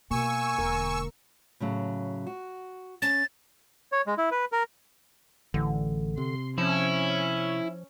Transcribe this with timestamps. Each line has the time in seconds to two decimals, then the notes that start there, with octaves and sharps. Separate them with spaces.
0.11 B2 A#3 G#5 C#6 E6
0.58 E1 D3 A#4
1.60 A2 C#3 F#3
2.27 F#4
3.02 C#4 A6
3.92 C#5
4.07 G#3
4.18 E4
4.31 B4
4.52 A#4
5.54 A1 D3 E3
6.18 C3 C6
6.58 F3 C#4 E4